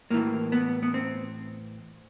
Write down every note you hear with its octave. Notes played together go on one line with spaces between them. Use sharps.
A2 E3 A#3
B3
B3
C4